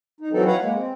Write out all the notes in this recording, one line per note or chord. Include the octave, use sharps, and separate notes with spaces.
D#4
E3 F#3 C4 D#4 A4
B4 C#5 F5 F#5 A#5
G#3 A#3
C4